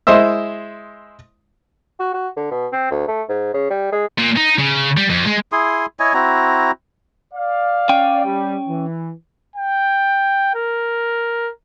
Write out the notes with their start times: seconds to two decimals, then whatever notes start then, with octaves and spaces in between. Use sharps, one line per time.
0.07 G#3 E4 C5 D#5 E5
2.00 F#4
2.14 F#4
2.36 D3
2.51 B2
2.72 C4
2.91 D2
3.08 A3
3.29 G#2
3.54 C#3
3.70 G3
3.92 G#3
4.18 A#2
4.37 D#4
4.59 C#3
4.97 G3
5.10 F2
5.25 G#3
5.52 E4 G#4 C6 D#6
6.00 E4 C#5 D#5 G#5
6.14 C4 E4 F#4 A#5
7.34 D5 F5
7.89 C#4 G5
8.25 G3
8.68 E3
9.56 G5
10.55 A#4